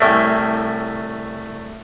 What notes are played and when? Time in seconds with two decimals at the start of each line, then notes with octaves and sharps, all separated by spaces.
0.01 C2 A2 A3 C#4 G5